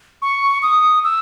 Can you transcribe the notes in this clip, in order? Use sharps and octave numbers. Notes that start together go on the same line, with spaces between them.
C#6
D#6
E6